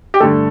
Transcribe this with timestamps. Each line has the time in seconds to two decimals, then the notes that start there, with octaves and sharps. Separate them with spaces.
0.14 G4
0.20 G2 D3 A3 A4